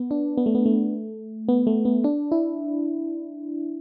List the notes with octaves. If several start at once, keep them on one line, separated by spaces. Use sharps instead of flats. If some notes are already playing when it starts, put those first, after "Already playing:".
Already playing: B3
D4
B3
A3
B3
A3
B3
A3
B3
D4
E4